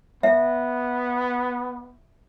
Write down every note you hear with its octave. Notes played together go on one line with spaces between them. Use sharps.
B3 E5